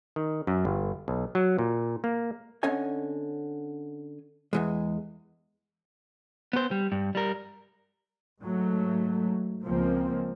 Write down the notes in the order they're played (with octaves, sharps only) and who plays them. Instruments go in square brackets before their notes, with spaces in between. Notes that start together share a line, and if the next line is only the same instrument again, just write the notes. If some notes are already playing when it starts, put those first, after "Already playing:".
[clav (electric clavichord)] D#3
F#2
G1
B1
F#3
A#2
A#3
[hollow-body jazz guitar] D3 C4 C#4 C#5 D#5 G#5
E2 E3 G#3
[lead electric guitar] B3 C5
G3
G2
G3 A#4
[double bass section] G#2 F#3 A3
C#2 F3 A#3 C4